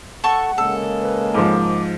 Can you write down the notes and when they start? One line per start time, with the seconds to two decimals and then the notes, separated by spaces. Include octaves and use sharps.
0.24 A4 F#5 A5 C#6
0.58 C#3 G#3 A#3 A4
1.02 B4
1.34 G#2 F3 D6